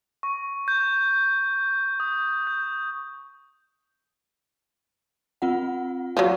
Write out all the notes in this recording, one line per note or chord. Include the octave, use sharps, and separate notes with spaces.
C#6
G6
D#6
G6
C4 F4 F#5
F3 F#3